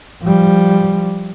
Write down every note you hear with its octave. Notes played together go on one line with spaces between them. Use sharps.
F3 G3